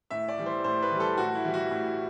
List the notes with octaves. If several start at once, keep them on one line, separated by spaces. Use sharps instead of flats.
A2 E5
D5
E3 G3
C5
A2 C5
B4
E3 G3
A4
A2 F#4
E4
E3 G3
F#4
A2